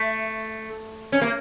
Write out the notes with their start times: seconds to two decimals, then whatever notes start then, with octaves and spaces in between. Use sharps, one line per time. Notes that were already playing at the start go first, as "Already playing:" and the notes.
Already playing: A3
1.12 C#4
1.22 A#3